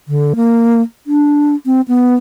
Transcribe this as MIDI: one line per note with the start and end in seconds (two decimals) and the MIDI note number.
0.08 0.33 50
0.36 0.81 58
1.07 1.55 62
1.66 1.81 60
1.88 2.15 59